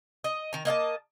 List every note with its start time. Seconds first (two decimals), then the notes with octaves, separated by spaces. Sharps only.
0.24 D#5
0.53 D#3 A#5
0.65 A#3 D#5 F5 A5